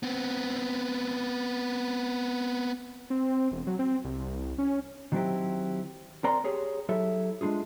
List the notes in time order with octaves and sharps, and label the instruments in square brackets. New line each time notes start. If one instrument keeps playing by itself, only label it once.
[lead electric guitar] B3 C4
[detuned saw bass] C4
E1
F#3
C4
C2
C#4
[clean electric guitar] D#3 F#3 C4 C#4 E4 G4
C4 A#4 D5 A#5 C6
G4 G#4 C#5
F#3 E4 G4 A4 E5
G#3 D4 D#4 F4 G#4